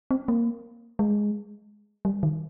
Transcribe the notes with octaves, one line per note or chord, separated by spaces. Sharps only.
C4
A#3
G#3
G3
D#3